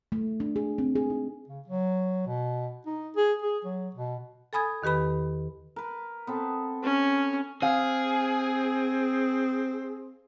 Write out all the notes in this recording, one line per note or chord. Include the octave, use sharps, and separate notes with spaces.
A3
D4
G#4
C4
G#4
D#4
C#3
F#3
B2
D#4
G#4
G#4
F#3
B2
A4 G#5 B5 D#6 G#6
E2 D#3 G4 B4 B5
A#4 B4
B3 C4 A4
C#4
C4 G#4 F5